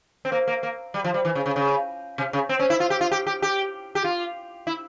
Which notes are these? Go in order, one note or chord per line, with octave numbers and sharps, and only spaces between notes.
C4
A#3
A#3
A#3
G3
F3
G3
E3
C#3
C#3
C#3
C3
C#3
C4
C#4
E4
F4
G4
F4
G4
G4
G4
G4
F4
E4